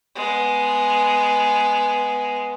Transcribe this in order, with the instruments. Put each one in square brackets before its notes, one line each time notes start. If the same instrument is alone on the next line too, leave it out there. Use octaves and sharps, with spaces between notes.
[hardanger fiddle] G#3 B3